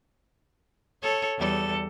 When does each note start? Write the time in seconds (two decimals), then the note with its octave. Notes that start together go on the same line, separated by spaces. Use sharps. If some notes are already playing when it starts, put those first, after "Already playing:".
1.02 A4 C#5
1.37 E2 G3 A4